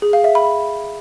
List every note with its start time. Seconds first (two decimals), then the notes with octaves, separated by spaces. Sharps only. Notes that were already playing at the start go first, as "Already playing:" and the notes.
0.02 G#4
0.13 F5
0.24 E5
0.35 B5